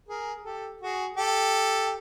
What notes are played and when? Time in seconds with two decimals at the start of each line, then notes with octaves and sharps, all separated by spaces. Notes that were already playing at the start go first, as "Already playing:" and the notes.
0.08 G#4 A#4
0.44 G4 A4
0.81 F#4 G#4
1.17 G4 A4